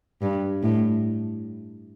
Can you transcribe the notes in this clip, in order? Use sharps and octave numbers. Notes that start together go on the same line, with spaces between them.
G2
A2